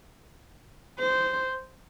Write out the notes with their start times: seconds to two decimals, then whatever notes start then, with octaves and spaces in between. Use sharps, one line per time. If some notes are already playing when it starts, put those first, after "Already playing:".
0.99 C5